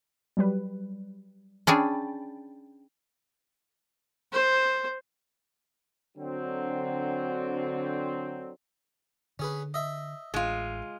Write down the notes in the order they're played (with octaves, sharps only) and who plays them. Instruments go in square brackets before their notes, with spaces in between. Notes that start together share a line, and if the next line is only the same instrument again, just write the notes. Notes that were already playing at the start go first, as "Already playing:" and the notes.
[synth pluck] F#3 G3 B4
[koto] C#4 D4 G#4 [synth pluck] G5 B5 A6
[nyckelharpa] C5
[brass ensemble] D3 F#3 C4
[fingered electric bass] D3 [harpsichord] C#4 G#4 B4
[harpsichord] D#5 E5
[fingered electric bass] A1 [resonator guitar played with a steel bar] G#3 F4